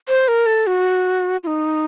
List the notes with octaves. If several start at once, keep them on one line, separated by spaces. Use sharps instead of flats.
C5
A#4
A4
F#4
F4
D#4